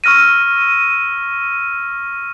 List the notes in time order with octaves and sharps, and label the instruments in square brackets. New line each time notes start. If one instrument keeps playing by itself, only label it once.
[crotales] C#6 E6 F6 A#6 D#7